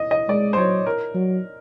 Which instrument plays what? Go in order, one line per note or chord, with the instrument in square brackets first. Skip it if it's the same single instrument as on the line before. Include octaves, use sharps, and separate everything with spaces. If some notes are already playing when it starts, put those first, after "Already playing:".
Already playing: [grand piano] D#5
D#5
[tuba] G#3 [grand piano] D5
[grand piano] C5
[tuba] F#3 [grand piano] C#5
[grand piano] A#4
[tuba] F#3